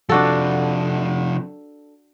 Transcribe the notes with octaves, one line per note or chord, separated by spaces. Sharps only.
C3 F3 D4 F#4 A4